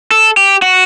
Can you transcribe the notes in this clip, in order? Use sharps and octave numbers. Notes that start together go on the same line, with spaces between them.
A4
G4
F#4